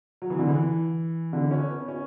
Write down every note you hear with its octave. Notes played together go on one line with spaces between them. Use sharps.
F#3
E3
D3
E3
D3
C#4
B3
C#4